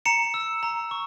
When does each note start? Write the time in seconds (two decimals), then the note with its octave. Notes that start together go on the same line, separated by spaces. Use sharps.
0.06 A#5 C#7 E7
0.34 E6
0.63 A#5
0.91 C#6